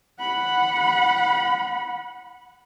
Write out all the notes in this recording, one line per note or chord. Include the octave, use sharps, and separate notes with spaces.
F#5 B5